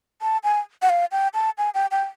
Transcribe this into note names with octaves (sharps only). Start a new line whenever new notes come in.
A5
G#5
F#5
F5
G5
A5
G#5
G5
G5